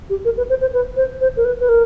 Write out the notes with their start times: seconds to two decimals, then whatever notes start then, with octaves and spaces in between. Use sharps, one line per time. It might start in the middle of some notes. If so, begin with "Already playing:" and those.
0.10 G4
0.25 A#4
0.37 B4
0.50 C5
0.61 C5
0.74 B4
0.96 C5
1.21 C5
1.37 A#4
1.45 B4
1.61 B4
1.69 A#4